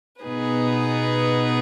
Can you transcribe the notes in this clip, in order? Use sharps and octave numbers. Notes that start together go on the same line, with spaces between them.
B2 B3 D#4 G#4 B4